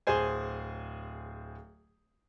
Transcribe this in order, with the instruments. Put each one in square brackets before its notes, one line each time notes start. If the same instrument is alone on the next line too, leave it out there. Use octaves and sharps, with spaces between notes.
[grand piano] D1 G#4 C5 G#5